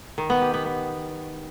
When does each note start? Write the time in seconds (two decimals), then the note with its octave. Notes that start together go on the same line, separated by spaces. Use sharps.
0.18 D#3
0.30 B3
0.42 G4
0.54 B3
0.66 B3